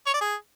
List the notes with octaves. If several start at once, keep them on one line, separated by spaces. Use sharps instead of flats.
C#5
D5
G#4